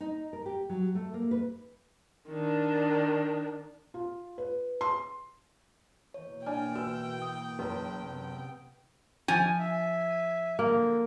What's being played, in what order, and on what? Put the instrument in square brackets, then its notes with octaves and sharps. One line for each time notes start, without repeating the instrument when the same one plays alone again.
[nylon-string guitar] D#4
A#4
G4
F#3
A3
A#3
B4
[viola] D#3 D4
[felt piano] F4
B4
C6
[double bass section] B2 E3 A#3 [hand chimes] C#5
[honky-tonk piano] D4 G#5 [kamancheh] G5 [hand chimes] F6
[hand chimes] F#4 B4 [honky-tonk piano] E6
[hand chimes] D#6
[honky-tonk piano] F#1 B4
[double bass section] C3 B3
[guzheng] F3 [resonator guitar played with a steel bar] G#5
[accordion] E5
[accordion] D3 [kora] A#3